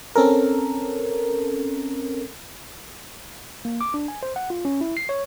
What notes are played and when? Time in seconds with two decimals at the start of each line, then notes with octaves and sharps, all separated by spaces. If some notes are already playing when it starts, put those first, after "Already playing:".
0.16 C4 C#4 A4 A#4
3.65 A#3
3.81 D6
3.94 D4
4.08 G#5
4.23 C5
4.36 F#5
4.50 F4
4.65 C#4
4.81 E4
4.97 C7
5.09 C#5